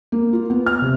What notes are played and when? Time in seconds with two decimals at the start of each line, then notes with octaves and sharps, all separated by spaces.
0.12 A#3
0.33 F4
0.50 B3
0.66 F6
0.82 C3